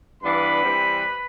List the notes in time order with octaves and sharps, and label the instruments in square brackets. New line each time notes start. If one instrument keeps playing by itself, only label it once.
[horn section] G2 E3 B3 D4 B4 B5
E3 G3 C4